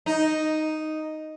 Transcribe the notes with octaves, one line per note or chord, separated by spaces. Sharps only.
D#4